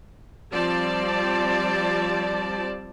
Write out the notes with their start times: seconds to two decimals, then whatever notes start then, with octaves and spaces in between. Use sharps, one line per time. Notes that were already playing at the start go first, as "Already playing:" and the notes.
0.52 F3 G3 C4 D5 A5